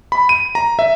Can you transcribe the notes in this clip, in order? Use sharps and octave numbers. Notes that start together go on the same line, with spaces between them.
B5
D#7
A#5
E5